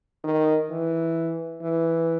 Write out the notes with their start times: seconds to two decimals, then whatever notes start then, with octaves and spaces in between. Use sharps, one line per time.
0.24 D#3
0.70 E3
1.62 E3